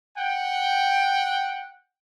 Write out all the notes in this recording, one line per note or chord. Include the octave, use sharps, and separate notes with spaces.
F#5 G5